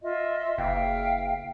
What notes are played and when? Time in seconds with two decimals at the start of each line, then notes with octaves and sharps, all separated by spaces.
0.03 F4 D#5 E5
0.58 F#1 E5 F5 G5